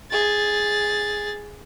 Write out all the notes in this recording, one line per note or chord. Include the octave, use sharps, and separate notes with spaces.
G#4 A6